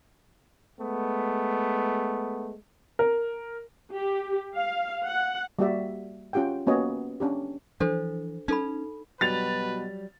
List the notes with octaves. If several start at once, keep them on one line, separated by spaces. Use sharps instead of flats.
G#3 A3 B3
A#4
G4
F5
F#5
G3 A#3 F#4 G4 D5 E5
C#4 F4 G4 F#5 G5
A#3 B3 C#4 F#4 C#5 D#5
C#4 D4 G4
E3 F3 D4 A4 C5
C#4 D#4 A4 B5
B2 F#3 G3 B4 A6 F7